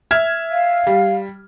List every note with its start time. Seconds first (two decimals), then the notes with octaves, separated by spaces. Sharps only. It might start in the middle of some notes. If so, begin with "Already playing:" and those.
0.11 E5 F6 G#6
0.51 F5
0.87 G3